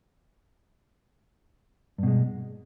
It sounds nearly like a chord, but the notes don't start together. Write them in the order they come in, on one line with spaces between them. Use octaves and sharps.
G2 B2 G#3